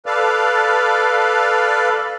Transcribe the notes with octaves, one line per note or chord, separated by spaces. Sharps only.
A4 B4 D5 F5